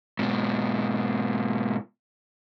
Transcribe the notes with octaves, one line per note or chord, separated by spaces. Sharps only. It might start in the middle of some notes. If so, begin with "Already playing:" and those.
G#2 B2